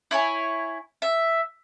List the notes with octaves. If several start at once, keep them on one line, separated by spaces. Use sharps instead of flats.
E4 C#5 G#5
E5